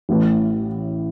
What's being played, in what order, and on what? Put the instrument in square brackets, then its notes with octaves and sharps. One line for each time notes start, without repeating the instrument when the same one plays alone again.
[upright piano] A1 A2 E3